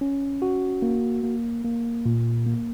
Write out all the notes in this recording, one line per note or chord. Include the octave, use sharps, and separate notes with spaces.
C#4
F#4
A#3
A#3
A#3
A#2
A#3